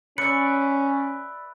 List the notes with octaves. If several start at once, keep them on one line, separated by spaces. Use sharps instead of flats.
C#4 B4 D5 E5 C#7